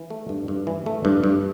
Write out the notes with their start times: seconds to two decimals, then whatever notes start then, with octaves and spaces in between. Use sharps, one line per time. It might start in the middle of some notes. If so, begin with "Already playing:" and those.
Already playing: E3
0.10 A3
0.29 G2
0.48 G2
0.67 E3
0.86 A3
1.05 G2
1.24 G2